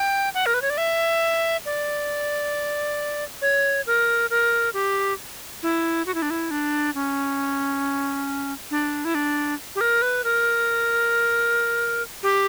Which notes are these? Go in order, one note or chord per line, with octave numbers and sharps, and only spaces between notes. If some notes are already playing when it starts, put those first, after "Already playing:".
Already playing: G5
F#5
A#4
B4
C#5
D5
E5
D5
C#5
A#4
A#4
G4
E4
F#4
E4
D4
E4
D4
C#4
D4
E4
D4
G4
A#4
B4
A#4
G4